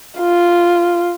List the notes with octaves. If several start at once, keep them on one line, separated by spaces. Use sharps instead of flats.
F4